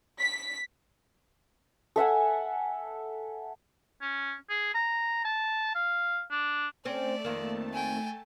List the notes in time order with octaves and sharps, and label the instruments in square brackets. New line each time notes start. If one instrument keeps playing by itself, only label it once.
[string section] B6
[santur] A4 E5 F#5 G#5
[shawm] C#4
G#4
A#5
A5
F5
D4
[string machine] A3 A5 [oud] C4 C#4 [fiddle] D5
[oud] F2 D#3 A#3
[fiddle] G5 G#5